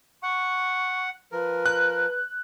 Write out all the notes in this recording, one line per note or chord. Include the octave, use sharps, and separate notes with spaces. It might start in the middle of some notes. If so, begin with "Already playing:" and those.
F#5 C#6
F3 A#4 B4
F#6